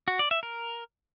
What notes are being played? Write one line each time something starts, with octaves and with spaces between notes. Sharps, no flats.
F#4
D5
E5
A#4